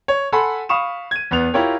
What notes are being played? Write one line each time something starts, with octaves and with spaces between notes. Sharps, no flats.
C#5
A4 F#5 G#5 B5 C6
F5 B5 C#6 D#6 E7
G#6 D#7
E2 B3 F7
E4 F4 G4 A#4 C#5